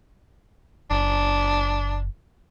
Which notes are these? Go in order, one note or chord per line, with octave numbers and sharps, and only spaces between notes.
F#1 D4